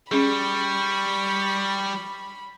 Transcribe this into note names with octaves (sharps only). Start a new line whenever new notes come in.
G3 C#4 G#4 B5 C#6